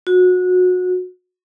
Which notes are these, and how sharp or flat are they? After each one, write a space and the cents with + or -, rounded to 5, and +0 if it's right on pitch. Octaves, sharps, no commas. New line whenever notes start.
F#4 -25